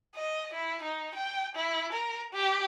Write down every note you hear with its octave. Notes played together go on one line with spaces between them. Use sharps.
D#5
E4
D#4
G5
E4
A#4
G4